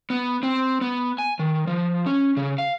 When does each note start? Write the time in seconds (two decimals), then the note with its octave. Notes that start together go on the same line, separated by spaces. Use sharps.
0.10 B3
0.43 C4
0.81 B3
1.18 G#5
1.39 D#3
1.67 F3
2.06 C#4
2.37 C#3
2.58 F5